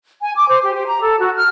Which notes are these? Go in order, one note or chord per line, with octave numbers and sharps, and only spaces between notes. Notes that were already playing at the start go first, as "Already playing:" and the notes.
G#5
D6
C5
G4
G4
A#5
A4
F#4
F6